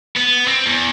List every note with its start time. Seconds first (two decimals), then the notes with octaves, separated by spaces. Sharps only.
0.17 B3
0.48 C4
0.66 E2